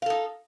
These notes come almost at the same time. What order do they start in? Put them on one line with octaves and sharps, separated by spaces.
F5 A4 D#4